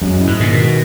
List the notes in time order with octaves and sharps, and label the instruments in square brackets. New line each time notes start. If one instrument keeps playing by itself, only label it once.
[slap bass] F#2 [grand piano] G#3
[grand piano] E4
[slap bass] G#2
[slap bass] A#2 [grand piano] D#3
[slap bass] B2
[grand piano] G#3